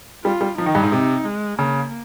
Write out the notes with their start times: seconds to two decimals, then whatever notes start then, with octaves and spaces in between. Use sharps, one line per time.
0.24 G3 F4
0.41 G3
0.58 F3 D#4
0.66 D#3
0.75 G2
0.83 G#2
0.92 C3
1.25 G#3
1.59 C#3 A#3